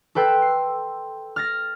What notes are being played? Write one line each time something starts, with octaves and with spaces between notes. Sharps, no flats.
A4 B4 G5 C6 E6
C7
F6 A6 A#6